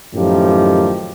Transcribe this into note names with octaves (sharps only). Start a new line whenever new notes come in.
F#2 A2 D#3 F3 G4